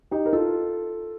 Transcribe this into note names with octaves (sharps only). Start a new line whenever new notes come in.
D#4 G4
A#4
F4 A4